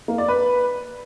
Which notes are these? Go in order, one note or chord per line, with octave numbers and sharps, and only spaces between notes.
A#3
D5
B4